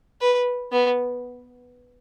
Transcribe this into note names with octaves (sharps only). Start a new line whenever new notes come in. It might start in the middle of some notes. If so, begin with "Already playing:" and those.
B4
B3